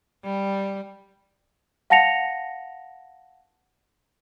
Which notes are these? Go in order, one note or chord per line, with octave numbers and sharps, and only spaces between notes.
G3
F5 F#5 A5 A#6 C#7 F7